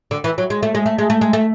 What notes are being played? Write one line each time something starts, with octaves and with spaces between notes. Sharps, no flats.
D3
E3
F#3
G#3
A3
G#3
A3
G#3
A3
G#3
A3